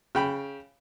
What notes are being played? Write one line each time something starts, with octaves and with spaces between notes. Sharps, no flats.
C#3 G5 B5